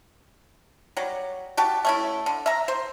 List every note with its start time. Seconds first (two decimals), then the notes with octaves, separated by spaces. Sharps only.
0.97 F#3 G3
1.57 F#4 G4 A5
1.85 A3 C#4 E4
2.26 D3
2.46 E5 A#5
2.68 C5